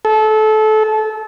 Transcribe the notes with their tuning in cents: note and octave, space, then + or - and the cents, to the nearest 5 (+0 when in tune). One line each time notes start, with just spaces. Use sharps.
A4 -25